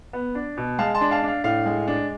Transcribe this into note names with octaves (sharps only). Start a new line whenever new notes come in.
B3
D4
B2
G#3 F5 A5
A5 C6
D4
F5 A5
D4
F5
A2 F5
G#3
D4